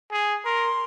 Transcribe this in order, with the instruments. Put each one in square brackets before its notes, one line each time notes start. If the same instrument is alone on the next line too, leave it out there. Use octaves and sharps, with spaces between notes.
[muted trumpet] G#4
[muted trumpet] A#4 [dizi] C6